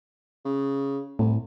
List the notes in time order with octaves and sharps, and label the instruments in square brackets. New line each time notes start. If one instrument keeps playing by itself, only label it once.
[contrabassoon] C#3
[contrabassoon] C2 [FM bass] A2